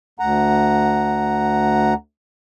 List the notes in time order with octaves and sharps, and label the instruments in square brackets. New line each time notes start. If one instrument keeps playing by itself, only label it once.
[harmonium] D2 F#5 A#5